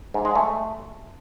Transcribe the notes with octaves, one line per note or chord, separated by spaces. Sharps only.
G#2
G#3
A3